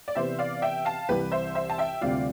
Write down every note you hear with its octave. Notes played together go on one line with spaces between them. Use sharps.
D5
C3 E3 B3 C5 E5
D5 F5
E5 G5
F5 A5
C2 C3 E3 G4 B4
C5 E5
C5 E5
A5
E5 G5
D2 C3 G3 C4 F4 D5 F5